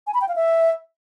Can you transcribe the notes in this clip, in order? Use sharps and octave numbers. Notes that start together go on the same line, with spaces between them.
G#5
B5
G5
F5
E5